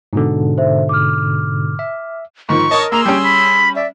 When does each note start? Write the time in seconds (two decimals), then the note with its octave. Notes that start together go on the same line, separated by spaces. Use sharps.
0.13 G#2 B2 D3
0.58 C5 E5
0.89 D6 F6
1.79 E5
2.49 G#2 D#3 F3 C#6
2.71 A#4 C#5 D#5 A5 D#6
2.92 A#3 G#4 A#5 C6 E6
3.06 G3 C#4 G4 G5
3.24 B5 B6
3.76 D5 E5